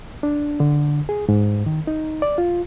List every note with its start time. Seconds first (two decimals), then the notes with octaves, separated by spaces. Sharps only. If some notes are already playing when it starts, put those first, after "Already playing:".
0.23 D4
0.60 D3
1.09 G#4
1.29 G#2
1.66 D#3
1.87 D#4
2.22 D5
2.38 F4